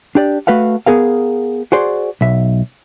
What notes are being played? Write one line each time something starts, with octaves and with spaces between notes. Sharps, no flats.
D4 G4 D5
A3 F#4 B4 F5 F#5
B3 G#4 A#4 F5
F#4 G#4 C5 D5
B1 E5